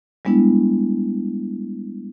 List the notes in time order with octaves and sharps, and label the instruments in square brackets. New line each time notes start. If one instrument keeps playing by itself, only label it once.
[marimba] G3 G#3 B3 D4 E4